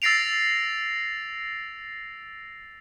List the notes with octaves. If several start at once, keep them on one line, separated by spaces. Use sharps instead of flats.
E6 A6 A#6 C7 D7 F7